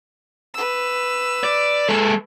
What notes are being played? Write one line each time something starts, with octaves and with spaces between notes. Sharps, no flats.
B4 E6
D5
G#3 A4